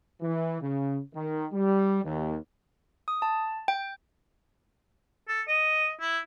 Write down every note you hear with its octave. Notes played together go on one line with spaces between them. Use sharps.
E3
C#3
D#3
G3
D#2
D#6
A5
G5
A4
D#5
E4